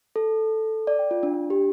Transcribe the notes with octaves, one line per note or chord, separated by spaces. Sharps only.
A4
D5
G5
F4
D4
D4
G4